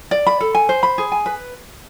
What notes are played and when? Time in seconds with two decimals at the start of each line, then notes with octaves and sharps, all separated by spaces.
0.11 D5
0.27 B5
0.40 A4
0.55 G#5
0.69 C5
0.83 B5
0.98 G#4
1.12 G#5
1.26 B4